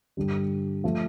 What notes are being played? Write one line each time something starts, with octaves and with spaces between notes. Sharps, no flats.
G2 D3 G3
F3 A3